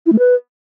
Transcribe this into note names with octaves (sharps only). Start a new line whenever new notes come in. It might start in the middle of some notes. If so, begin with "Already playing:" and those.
E4
A3
B4